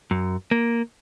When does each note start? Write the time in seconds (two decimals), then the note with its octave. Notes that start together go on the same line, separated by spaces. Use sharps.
0.11 F#2
0.51 A#3